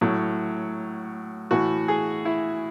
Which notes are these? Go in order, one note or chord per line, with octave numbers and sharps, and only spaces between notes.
A2 F#3
A2 E3 F#4
G#4
E4